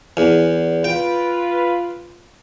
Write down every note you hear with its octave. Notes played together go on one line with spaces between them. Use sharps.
E2
F4 B4 G5